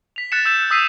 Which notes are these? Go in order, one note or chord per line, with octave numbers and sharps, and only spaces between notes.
B6 F7
F#6 A6 B6 C#7 E7
E6 G6 E7
D#6 E6 B6 C7 D#7